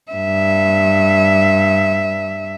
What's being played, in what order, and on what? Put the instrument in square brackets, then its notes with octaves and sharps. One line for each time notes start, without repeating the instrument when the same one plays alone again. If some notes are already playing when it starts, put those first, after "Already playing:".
[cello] G2 E5